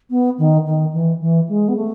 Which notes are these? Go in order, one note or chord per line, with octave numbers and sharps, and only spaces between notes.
B3
D#3
D#3
E3
E3
G#3
B3
A3